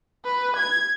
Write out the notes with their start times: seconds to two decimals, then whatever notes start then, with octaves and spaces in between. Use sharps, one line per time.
0.25 B4
0.57 G#6